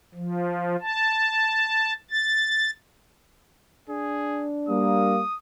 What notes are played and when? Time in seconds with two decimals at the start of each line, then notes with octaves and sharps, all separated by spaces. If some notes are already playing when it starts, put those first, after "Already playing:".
0.14 F3
0.82 A5
2.11 A6
3.89 D4 G#4
4.69 G3 A#3 D#6